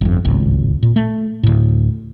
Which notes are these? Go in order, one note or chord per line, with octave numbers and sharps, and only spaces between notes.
G1 F2
D1 G#1 C#2
A#2
A3
D2 A2